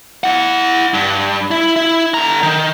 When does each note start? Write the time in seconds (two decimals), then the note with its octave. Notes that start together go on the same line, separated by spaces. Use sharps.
0.24 E4 F#5
0.94 G2
1.51 E4
1.76 E4
2.14 D3 A#5
2.43 D#3